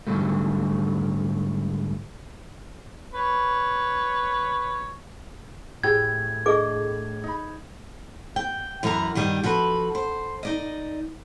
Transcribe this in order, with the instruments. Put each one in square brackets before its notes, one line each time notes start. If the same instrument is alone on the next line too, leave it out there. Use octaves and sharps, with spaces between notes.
[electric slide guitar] G#2 D3 D#3 F#3 G3 A3
[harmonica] B4 C#5
[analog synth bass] A2 [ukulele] E4 G4 G#4 [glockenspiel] G#6
[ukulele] D4 D#5 [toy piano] G#4 A4 D6
[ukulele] D#4 B5
[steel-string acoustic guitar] G5
F#2 E3 A#4 B4 A#5
G2 D#3 G3 G#4 D#5
F3 F#4 A4 B4
C5
D#4 D5 D#5